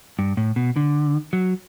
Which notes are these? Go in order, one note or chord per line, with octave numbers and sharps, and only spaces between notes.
G2
A2
B2
D3
F#3